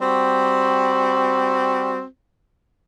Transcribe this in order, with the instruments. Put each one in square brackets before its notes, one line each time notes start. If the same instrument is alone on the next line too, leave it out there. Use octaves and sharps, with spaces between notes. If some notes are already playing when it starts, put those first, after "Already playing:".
[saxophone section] G3 C4 F#4